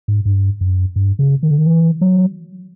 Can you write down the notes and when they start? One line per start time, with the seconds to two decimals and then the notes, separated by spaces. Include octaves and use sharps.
0.08 G#2
0.25 G2
0.61 F#2
0.96 G2
1.19 C#3
1.43 D#3
1.51 D3
1.58 D#3
1.66 E3
2.01 F#3